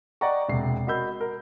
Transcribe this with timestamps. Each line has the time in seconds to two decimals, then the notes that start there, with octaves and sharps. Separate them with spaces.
0.21 D5 D#5 F#5 G5 A#5 C#6
0.48 E1 C3 C7
0.87 F#4 A#4 D#5 B5 E6 G6
1.20 A#4